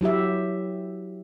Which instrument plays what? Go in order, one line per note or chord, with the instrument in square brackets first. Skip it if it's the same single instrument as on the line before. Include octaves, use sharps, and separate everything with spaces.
[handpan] F#3 E4 G4 E5